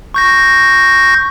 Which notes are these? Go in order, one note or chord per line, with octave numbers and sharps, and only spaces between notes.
C#6 G6 A#6